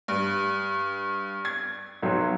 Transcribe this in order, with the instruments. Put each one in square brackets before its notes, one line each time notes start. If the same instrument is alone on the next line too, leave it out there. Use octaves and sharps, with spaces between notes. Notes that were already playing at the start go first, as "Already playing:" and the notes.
[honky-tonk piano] G2
G#6
[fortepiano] B1 F#3